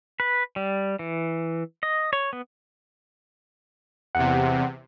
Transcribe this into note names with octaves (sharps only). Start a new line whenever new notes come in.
B4
G3
E3
D#5
C#5
B3
E2 C3 F#5